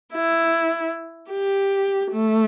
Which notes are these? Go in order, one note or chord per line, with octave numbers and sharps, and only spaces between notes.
E4
G4
A3